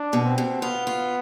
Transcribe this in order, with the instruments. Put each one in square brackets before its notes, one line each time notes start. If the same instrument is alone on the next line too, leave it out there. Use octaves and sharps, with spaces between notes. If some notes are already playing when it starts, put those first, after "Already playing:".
Already playing: [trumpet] D4
[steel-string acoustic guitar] B2
[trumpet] C4
[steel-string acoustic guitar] B2
[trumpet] B3 [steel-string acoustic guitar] F4
[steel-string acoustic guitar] F4